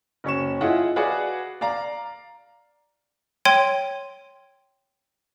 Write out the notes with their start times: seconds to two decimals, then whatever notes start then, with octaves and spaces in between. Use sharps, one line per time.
0.24 F#1 C#4 C#6 E7
0.61 E4 F4 G#4 D#5 F#5
0.96 F#4 G#4 B4 D5 F5 F#5
1.61 D5 F5 A#5
3.45 C#5 G5 C6 G#6 D#7